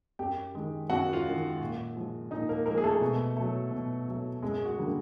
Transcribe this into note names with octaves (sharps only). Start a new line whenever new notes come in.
F#2 G4 G5
D#3 G#3
F#2 F#4 F#5
F4 F5
D#3 G#3
A#2
F3 G#3
A#2 D#4 D#5
A#3 A#4
F3 G#3 A#3 A#4
G#4
A3 A4
B2
F#3 A3
B2
F#3 A3
F#2 G#3 G#4
F#4
D3 G3 A#3